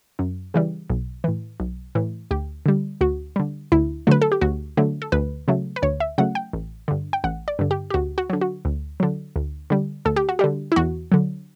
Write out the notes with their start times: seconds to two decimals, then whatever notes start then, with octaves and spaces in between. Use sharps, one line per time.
0.19 F#2
0.54 C#3 E3 G3
0.90 B1
1.24 A2 E3
1.60 B1
1.95 A2 E3
2.31 D2 G4
2.66 D3 G3
3.01 D2 F#4
3.36 D3 G3
3.72 D2 E4
4.07 D3 F#3 A3 B4
4.22 A4
4.32 G4
4.41 D2 F#4
4.77 D3 F#3 A3
5.02 A4
5.12 D2 B4
5.48 C#3 F#3 A3
5.76 B4
5.82 D2 C#5
6.00 E5
6.18 C#3 F#3 A3 F#5
6.35 G5
6.53 A1
6.88 G2 D3
7.13 G5
7.24 A1 F#5
7.48 D5
7.59 G2 D3
7.71 G4
7.90 G4
7.94 D2 F#4
8.18 F#4
8.30 D3 F#3
8.41 F#4
8.65 D2
9.00 D3 F#3
9.36 D2
9.70 D3 G3
10.05 D2 A4
10.16 G4
10.29 F#4
10.39 D3 G3 G4
10.72 E4
10.76 E2 F#4
11.12 D3 F#3